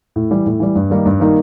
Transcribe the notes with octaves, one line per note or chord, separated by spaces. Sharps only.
A2
E3 G3
A2
E3 G3
G2
D#3 G3 A#3 D#4
G2
D#3 G3 A#3 D#4